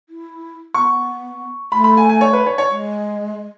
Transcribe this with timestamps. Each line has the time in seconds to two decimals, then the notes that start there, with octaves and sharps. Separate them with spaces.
0.09 E4
0.74 B3 C#6
1.72 A3 B5
1.84 B5
1.97 G#5
2.09 G#5
2.21 C#5
2.33 B4
2.46 C#5
2.58 C#5
2.70 G#3